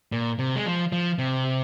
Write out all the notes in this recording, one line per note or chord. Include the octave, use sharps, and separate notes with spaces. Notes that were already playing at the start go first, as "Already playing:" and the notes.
A#2
C3
G#3
F3
F3
C3